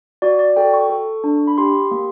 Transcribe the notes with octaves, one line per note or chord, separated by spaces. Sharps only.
F#4 D5
D5
A4 G5
C#6
A4
D4
B5
G4 C6
A#3